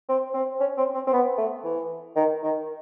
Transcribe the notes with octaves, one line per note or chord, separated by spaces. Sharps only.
C4
C4
C#4
C4
C4
C4
B3
A3
E3
D#3
D#3